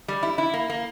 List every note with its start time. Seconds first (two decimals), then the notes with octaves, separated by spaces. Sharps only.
0.08 G3
0.23 E4
0.38 E4
0.54 A#3
0.70 A#3